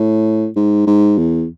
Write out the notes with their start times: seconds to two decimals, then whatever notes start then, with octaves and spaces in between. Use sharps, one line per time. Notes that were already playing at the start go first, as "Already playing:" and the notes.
Already playing: A2
0.56 G#2
0.87 G#2
1.18 E2